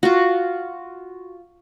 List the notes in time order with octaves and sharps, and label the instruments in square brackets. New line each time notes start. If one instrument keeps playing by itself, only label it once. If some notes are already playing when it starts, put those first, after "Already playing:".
[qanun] F4 F#4